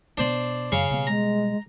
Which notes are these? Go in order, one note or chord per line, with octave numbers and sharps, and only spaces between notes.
B2 D4 C5 D5
F#2 C#3 F5 C#6
B2 G3
G#3 A#5